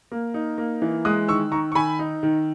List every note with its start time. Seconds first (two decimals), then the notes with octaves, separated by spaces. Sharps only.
0.12 A#3
0.34 D#4
0.58 A#3
0.82 E3
1.05 G#3 D#6 F#6
1.28 D#3 C#6 E6
1.52 D#3 A#5 C#6
1.72 C#6
1.75 D#3 G#5 B5
1.99 D#4
2.23 D#3